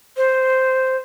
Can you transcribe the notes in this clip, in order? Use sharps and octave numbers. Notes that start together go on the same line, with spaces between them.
C5